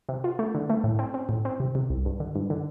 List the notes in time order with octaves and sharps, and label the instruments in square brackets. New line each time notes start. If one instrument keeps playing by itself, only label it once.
[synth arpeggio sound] C3
F4
A3
D3
A3
A2
C4
C4
A2
C4
C3
C3
C2
G2
D3
G2
D3